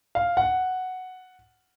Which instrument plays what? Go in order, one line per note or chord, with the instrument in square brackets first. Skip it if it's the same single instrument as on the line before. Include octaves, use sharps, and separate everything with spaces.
[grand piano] F5
F#5